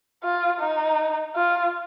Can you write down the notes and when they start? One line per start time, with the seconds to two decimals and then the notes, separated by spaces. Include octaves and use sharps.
0.23 F4
0.60 D#4
1.35 F4